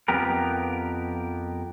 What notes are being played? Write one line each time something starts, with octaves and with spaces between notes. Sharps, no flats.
F2 B3 G4 A#4